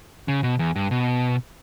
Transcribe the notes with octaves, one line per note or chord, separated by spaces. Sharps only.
C#3
B2
E2
G2
B2